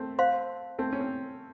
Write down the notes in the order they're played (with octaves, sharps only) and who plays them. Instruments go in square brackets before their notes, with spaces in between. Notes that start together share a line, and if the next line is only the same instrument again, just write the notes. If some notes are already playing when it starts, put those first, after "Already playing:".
Already playing: [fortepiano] A3 C4
[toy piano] C5 F5 C6
[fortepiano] A3 C4
C#4
C4